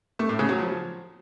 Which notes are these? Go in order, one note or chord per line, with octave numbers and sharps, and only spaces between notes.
A3
A2
C#3
F#3
F3